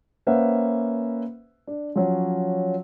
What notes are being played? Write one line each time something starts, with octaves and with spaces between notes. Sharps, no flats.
A#3 C#4 B4 C5 E5 F#5
D4
F3 F#3 C#4